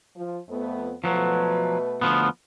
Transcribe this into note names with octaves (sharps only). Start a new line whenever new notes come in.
F3
F2 A3 B3
B2 F3 F#3 A3 B4
D2 F3 B3